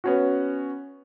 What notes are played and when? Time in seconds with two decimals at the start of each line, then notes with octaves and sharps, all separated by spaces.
0.04 B3 C#4 F#4